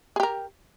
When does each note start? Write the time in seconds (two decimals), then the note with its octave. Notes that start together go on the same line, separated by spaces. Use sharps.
0.16 G#4
0.20 G4
0.23 A#4